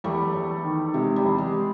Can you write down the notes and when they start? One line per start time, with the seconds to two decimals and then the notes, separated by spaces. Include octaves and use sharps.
0.04 E2 G3 A3
0.34 E2
0.64 D#3
0.94 C3 G#3
1.16 G3
1.24 E2
1.38 G#3